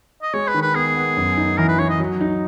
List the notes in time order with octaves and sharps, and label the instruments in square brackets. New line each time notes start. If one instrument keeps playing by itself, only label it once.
[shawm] D#5
[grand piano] G#3 [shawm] C#5
[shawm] B4
[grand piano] D#3
[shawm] B4
[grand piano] B3 [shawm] G#4
[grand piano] B3
F#2
D#4
[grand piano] E3 [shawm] A#4
[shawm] B4
[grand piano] D#4 [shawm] C#5
[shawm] D#5
[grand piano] F#3
D#4